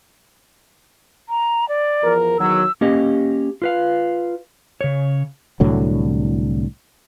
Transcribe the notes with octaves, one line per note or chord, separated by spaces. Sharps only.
A#5
D5
E2 F3 A#4
E2 D#3 F#3 E6
A#3 C#4 G4 D#5
F4 B4 F5
C#3 C#5
C2 A2 D3 F#3